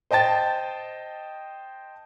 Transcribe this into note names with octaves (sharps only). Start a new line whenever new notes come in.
C5 D#5 G5 A5 A6